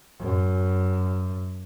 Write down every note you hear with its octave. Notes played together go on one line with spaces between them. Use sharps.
F#2